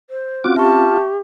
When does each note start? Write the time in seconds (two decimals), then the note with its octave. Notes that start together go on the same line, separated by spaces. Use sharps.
0.10 C5
0.44 C4 C#4 F4 F#4 D6
0.56 F4 G4 E5 A5 C#6